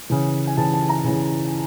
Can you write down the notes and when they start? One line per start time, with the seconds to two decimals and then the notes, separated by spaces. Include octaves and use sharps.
0.10 C#3 E3
0.47 G#5
0.57 C#3 E3 A5
0.74 A5
0.89 A#5
1.04 C#3 E3